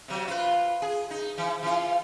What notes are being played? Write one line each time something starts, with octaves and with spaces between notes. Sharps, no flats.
C3 F#3
F4 B4
G#4
D#4
E3
E3 F4